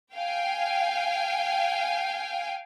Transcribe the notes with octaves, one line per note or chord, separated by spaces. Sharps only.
F5 G5 G#5